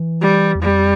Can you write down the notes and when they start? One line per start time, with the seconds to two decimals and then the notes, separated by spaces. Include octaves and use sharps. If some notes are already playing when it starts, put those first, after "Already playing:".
Already playing: E3
0.21 G3
0.55 E2
0.62 F2 G3